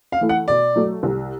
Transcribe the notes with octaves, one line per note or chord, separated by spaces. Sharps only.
F5
E3 A3
F#5
B2 D5
F#3 A3
C2